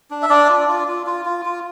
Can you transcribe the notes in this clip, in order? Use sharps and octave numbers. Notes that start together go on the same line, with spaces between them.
D4
E5
D4 D5
F4
F4
F4
F4
F4
F4